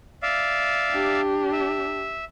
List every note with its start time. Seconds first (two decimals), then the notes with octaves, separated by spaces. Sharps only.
0.23 D5 E5 F5
0.91 D4 G4
1.52 E5